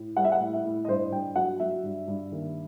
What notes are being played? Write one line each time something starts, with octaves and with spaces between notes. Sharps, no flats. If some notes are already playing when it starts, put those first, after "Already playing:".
Already playing: A2
G3 F#5
E5
F#5
A2
E5
A2
D#5
G2 C5
G2 G5
F#3 F#5
F#3 E5
G2
G2
D#2